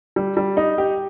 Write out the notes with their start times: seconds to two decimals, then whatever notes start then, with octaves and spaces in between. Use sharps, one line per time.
0.16 G3
0.37 G3
0.57 D#4
0.78 G4